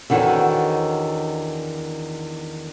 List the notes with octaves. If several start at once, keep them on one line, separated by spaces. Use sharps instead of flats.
E2 D3 D#3 F#4 C#5